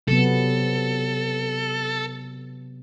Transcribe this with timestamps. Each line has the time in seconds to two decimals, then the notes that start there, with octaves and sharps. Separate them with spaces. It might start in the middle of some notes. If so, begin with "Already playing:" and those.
0.08 C3 F#3 B3 A4